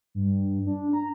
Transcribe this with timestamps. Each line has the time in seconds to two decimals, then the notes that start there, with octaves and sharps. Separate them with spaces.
0.15 G2
0.67 D4
0.93 A#5